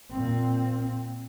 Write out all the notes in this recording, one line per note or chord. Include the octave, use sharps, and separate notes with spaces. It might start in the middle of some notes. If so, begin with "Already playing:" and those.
A#2 C4